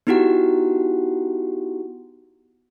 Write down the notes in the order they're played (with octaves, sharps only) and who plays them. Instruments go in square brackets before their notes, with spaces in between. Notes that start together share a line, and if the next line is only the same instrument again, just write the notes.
[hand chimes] B3 D#4 E4 F#4 G4 F#5